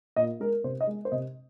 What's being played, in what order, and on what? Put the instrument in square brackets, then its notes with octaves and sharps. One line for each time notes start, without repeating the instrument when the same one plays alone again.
[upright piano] A#2 D#5
G#3 A#4
C3 C5
D#5
G#3
C5
C3 D#5